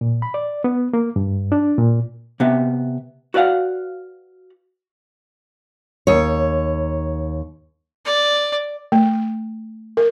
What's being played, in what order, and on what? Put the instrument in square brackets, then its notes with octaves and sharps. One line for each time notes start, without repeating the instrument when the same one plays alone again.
[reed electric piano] A#2
B5
D5
B3
A#3
G2
D4
A#2
[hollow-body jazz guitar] C3 B3 E5
F#4 B4 D5 F5 F#5
[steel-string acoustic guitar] D#2 C#5
[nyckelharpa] D5
[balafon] A3
A#4